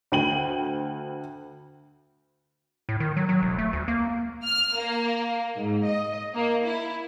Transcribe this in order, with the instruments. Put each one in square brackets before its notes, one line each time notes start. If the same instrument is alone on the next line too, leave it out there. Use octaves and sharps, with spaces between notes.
[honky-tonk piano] D2 G5 D#7 F#7
[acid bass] A2
D#3
F#3
F#3
E1
A3
D2
A#3
[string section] F6
A#3
G#2
D#5
A#3
E4